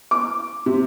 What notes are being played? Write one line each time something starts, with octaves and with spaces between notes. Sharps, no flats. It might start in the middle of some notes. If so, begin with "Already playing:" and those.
D6
C3